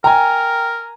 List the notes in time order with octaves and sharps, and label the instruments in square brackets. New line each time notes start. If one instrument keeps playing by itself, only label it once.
[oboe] A#4 [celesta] G5 [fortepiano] G#5 A#5